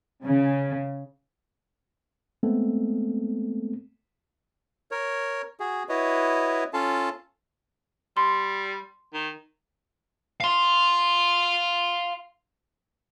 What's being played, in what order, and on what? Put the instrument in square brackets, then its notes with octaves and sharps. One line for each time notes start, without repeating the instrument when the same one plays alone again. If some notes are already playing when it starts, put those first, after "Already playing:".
[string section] C#3
[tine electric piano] G#3 A3 B3 C4 A4
[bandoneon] A#4 C#5
F#4 G#4
E4 F#4 B4 C#5 D#5
C#4 F4 A4 F5 A5
[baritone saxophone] G3 [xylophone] C6
[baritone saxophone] D#3
[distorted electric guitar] F5 C6